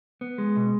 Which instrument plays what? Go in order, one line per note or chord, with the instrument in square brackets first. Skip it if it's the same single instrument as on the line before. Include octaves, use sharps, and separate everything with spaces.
[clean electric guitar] B3
G#3
B2